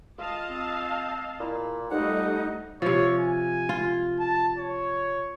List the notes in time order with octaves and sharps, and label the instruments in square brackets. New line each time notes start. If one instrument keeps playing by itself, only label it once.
[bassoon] F4 [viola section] D#5 F5 A5
[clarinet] C4
[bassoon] A#2 [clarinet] E4
[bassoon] F2 [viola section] G3 A3 [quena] D#4 [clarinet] F#5
[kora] C3 F3 [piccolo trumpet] C#5
[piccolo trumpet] G#5
[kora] F4
[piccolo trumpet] A5
C#5